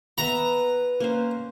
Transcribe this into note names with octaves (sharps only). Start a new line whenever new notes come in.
B3 B4 E5 F#5 A#5
A#3 C#4 C5